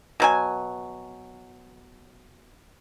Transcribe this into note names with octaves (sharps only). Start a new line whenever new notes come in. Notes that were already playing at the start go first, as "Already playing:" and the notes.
B2 F#3 G#5